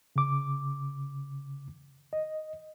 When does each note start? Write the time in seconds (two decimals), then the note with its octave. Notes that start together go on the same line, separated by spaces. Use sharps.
0.16 C#3 D6
2.13 D#5